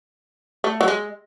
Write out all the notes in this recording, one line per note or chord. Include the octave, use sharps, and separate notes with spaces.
A3
F#3
G#3